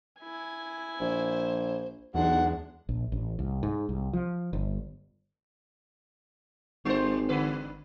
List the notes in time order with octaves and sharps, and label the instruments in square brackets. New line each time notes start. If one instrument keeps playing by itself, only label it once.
[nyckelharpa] E4 G#5
[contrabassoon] A#1 [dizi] C5
[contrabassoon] B1 [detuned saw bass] E2 [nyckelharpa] G#3 D4 [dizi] F#5
[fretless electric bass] A#1
A1
C2
G#2
C2
F3
G1
[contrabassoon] G#1 [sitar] G3 C5
[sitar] D3 B4